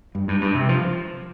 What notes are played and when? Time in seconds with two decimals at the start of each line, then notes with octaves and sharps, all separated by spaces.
0.15 G2
0.28 G2
0.41 G2
0.55 C3
0.69 F3